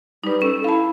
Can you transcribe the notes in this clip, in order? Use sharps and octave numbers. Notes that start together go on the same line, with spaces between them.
G3 D#4 B4
C#4 A4
E4 F5 A5